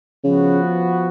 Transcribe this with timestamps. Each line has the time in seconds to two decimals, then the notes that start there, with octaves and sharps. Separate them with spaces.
0.24 C#3 F3 B3 F#4